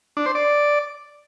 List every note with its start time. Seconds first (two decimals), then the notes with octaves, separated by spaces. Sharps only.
0.17 D4
0.26 C5
0.35 D5